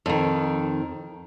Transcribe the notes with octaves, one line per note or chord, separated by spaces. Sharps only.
F2 D#3